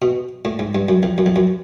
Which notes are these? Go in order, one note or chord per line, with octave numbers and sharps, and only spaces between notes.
B2
A2
G#2
G2
F#2
F2
F#2
F2
F#2